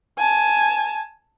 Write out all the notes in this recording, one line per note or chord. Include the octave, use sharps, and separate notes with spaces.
G#5 A5